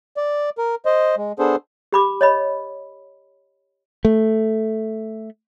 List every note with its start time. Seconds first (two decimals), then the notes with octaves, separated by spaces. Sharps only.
0.17 D5
0.58 A#4
0.85 C5 D#5
1.17 G#3
1.39 B3 D4 G#4 A4 C5
1.93 G4 B5 D6
2.21 C#5 D#5 B5
4.05 A3